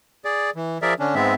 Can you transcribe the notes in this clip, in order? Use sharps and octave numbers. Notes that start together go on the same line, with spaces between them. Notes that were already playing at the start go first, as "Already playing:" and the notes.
G#4 D5
E3
F3 G#4 A#4 D5 E5
D3 C#4 D4
G#2 G#3 B3 C4 E5